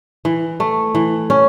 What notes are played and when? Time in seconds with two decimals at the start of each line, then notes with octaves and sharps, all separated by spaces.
0.25 E3
0.60 A3
0.95 E3
1.30 C#4